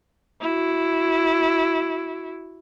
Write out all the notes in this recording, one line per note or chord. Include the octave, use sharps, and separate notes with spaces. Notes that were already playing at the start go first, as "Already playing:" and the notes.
E4 F#4